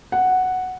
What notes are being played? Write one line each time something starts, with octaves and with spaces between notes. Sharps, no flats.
F#5